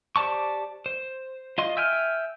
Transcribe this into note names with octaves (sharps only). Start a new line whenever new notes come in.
G4 C5 D5 A5 C#6
C5
F4 D#5 C6
E5 G5 G#5 F6